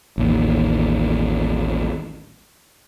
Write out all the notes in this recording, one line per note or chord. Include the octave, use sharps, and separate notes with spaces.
A1 D#2